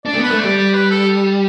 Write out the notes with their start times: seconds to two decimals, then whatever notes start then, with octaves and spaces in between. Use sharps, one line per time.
0.05 D4 D5
0.14 A3
0.18 B3 B4
0.31 A3
0.39 G3 D5
0.57 D5
0.74 B4
0.91 A4